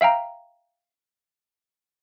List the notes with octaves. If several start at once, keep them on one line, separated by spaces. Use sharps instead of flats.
E5 F5 G5 A#5